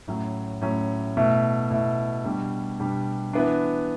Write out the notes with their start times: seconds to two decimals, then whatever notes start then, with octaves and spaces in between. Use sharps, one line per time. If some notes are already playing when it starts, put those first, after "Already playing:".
0.08 A2 F#3 C#4
0.61 A2 F#3 C#4
1.17 B2 A3 E4
1.71 B2 A3 E4
2.25 B2 G3 D4
2.80 B2 G3 D4
3.33 E3 B3 D4